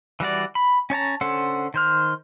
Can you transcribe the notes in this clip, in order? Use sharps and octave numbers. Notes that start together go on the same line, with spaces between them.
E3 G3 F#4 D5
B5
C#4 C#5 A5 A#5
D3 C#4 A4 C5 F#5
D#3 C5 F6